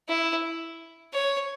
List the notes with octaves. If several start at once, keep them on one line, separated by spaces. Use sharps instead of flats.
E4
C#5